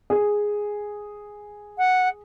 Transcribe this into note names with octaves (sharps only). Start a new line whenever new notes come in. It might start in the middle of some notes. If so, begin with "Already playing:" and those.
G#4
F#5